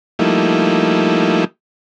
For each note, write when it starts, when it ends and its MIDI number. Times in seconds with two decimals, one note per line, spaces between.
0.19 1.45 53
0.19 1.45 55
0.19 1.45 57
0.19 1.45 58
0.19 1.45 63
0.19 1.45 64